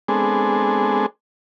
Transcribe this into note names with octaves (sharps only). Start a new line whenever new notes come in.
G#3 B3 C4 D4 G#4 A4